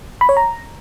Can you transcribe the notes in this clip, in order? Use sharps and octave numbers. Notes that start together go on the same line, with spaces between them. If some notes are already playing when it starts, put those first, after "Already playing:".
B5
C#5
A#5